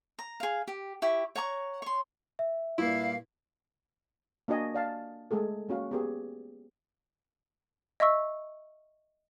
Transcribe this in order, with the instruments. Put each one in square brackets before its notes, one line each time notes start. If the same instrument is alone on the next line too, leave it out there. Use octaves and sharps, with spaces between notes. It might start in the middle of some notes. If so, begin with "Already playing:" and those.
[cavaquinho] A#5
G#4 F5
G4
E4 G4 C#6
C#5 F#5 A#5 C#6
C#5 C6
[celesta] E5
[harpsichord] G2 A#2 A#3 [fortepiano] E4 [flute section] F5
[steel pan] A#3 D4 F#4 D#5 G#5
D5 F5 A5
G#3 A3 G#4 A4
A#3 C#4 F#4 F5
B3 G4 G#4
[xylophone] D#5 E5 C#6 E6